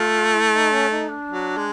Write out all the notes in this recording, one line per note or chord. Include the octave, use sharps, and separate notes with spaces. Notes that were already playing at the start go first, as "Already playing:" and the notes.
Already playing: A3 F4
E4
D#4
C#4
D#4
D4
F#3
G#3